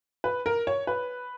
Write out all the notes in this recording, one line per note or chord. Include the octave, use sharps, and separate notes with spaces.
B4
A#4
C#5
B4